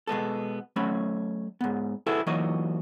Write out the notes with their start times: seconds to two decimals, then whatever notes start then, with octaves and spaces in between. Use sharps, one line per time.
0.07 B2 G#3 B3 A4
0.76 F#3 A3 C#4 C#5 B5
1.61 G#2 B3
2.07 E4 F#4 G#4 A4 B4
2.27 E3 F#3 A#3 D#4 F#4 D#5